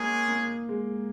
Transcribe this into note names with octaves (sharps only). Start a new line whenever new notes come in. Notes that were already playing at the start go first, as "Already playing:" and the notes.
Already playing: G#3 A#3 C#4 G#4
A#3
G#3